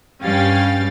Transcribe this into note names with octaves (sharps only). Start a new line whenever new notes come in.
G2 G3 C#4 F5 G5 A6